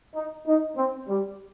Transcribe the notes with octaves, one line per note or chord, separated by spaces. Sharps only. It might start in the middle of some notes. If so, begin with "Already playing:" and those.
D#4
D#4
C4
G3